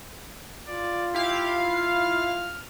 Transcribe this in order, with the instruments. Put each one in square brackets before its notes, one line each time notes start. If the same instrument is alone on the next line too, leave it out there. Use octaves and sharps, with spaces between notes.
[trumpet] F4 [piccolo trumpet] D5
[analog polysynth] E4 F5 [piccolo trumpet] G4
[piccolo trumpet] F6